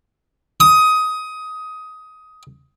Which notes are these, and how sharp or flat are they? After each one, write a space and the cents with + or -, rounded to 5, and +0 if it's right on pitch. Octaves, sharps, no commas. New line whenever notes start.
D#6 +15